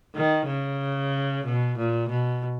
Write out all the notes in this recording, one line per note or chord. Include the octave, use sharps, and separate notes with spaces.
D#3
C#3
B2
A#2
B2